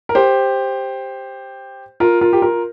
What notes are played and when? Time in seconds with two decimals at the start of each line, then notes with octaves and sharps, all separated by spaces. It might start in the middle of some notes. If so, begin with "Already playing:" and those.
0.09 A#4
0.15 G4 C5
2.00 F4 A#4
2.21 F4 A#4
2.33 G4
2.42 F4 A#4